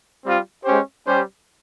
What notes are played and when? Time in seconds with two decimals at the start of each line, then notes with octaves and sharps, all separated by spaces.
0.23 G3 C4 F4
0.64 G#3 C#4 G4 C5
1.06 G3 C#4 G4 C5